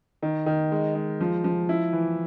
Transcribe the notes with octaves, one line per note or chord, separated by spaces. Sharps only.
D#3
D#3
G#3
G#3
F3
F3
E4
E3